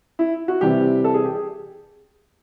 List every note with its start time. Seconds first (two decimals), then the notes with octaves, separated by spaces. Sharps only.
0.19 E4
0.48 F#4
0.61 C3 E3 G3 G4
1.04 A4
1.14 G#4
1.25 G4
1.35 G#4